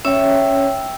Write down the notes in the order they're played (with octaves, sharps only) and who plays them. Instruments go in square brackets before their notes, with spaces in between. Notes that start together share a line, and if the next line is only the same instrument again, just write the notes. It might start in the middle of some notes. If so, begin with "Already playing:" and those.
[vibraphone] C#4 C#5 [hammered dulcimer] E5 G5